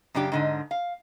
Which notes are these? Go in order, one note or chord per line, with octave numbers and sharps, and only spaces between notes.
F#2 C#3 D4 G4
G#2 D3 D#4
F5